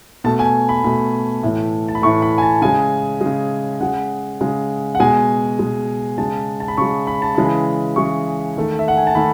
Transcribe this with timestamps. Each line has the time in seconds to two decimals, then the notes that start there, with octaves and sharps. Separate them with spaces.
0.24 B2 A3 A5
0.39 G#5
0.69 B5
0.84 B2 A3 B5
1.43 A2 E3 A3
1.88 A5
1.95 B5
2.02 A2 E3 A3 C#6
2.22 B5
2.38 G#5
2.42 A5
2.62 C#3 G#3 G#5
3.21 G#3
3.26 C#3
3.80 C#3 G#3 F#5
4.41 C#3 G#3
4.95 F#5
5.00 B2 G#3 G#5
5.59 B2 G#3
6.18 C#3 G#3 A5
6.60 A5
6.68 B5
6.78 C#3 G#3 C#6
7.07 B5
7.22 A5
7.35 C#3 E3 G#3 B5
7.96 C#3 E3 G#3 C#6
8.57 D#3 A3
8.79 E5
8.88 F#5
8.97 G#5
9.07 A5
9.15 D#3 A3 B5